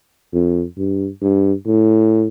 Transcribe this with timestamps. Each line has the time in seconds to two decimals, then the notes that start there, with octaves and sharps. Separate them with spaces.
0.34 F2
0.78 G2
1.22 G2
1.66 A2